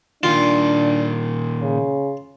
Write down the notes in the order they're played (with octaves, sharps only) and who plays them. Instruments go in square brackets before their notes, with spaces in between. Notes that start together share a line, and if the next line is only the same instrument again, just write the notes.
[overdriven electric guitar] A#2 D#3 [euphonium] D4 [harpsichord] F4
[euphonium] C#3